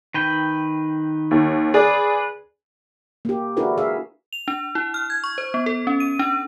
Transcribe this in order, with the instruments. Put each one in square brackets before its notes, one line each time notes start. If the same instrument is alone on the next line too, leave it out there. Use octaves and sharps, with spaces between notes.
[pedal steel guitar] D#3 B4 G5
[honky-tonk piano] D#2
[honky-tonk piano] G#4 D5 [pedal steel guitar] B4
[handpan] A#3 G4
D4 E4 F#4 G#4 A#4 B4
G#4 E5 F5
[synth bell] F7
D4
E4
F6
G#6
C#6
C5
B3
A4
C#4
D#7
D4